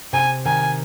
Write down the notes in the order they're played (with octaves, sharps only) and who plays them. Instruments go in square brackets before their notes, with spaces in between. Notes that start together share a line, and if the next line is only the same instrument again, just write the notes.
[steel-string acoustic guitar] C3 [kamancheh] G#5
[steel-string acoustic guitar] D#3 [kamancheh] G#5